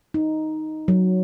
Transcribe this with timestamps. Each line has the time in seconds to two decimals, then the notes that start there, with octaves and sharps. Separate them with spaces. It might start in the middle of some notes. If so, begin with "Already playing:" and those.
0.14 D#4
0.88 F#3